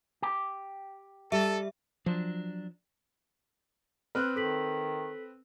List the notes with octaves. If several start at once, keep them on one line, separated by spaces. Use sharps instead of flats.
G4
G3 A4 E5
F3 F#3 D4
C4 B4 F6 F#6 F#7
D#3 A4 B6 F#7